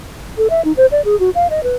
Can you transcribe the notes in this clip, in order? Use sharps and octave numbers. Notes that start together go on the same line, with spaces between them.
A4
E5
D#4
C5
D5
G#4
F#4
F5
D#5
B4